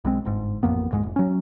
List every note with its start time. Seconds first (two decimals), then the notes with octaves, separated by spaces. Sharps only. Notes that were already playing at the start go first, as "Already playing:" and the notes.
0.05 B1 G#3 C4
0.25 G1 G#2
0.63 A1 F2 A#3 B3
0.92 D1 G#2 G#3
1.03 F1
1.16 F#3 C#4